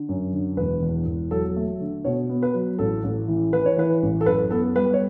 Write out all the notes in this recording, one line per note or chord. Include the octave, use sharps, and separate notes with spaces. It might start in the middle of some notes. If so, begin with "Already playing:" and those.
Already playing: D3
F#2
D3
E1 B4
E2
E1
F#3 A4
A3
D3
B2 C#5
B3
B4
F#3
A1 A4
A1
E3
E3 B4
C#5
E3 B4
A1
A4
F#2 B4
B3 A4
G3 B4
C#5